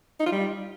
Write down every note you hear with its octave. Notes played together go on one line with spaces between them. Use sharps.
D#4
F4
G3